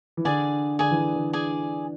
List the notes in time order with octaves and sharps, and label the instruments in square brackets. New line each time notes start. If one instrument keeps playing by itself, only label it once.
[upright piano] E3
[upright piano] D3 [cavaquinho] G#4 D5 G#5
[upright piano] D3 [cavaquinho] G#4 D5 G#5
[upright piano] E3
D3
D3
[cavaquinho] G#4 D5 G#5